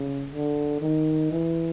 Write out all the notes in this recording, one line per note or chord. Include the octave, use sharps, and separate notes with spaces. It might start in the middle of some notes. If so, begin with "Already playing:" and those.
Already playing: C#3
D3
D#3
E3